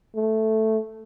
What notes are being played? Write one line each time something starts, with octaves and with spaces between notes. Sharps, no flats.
A3